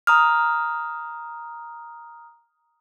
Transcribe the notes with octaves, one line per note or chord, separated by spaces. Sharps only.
A#5 D#6 F6